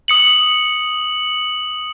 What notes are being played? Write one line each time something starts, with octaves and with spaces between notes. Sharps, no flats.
D#6 C#7 F#7